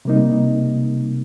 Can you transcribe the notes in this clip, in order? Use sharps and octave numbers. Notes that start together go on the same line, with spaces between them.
C3 G3 A#3 D#4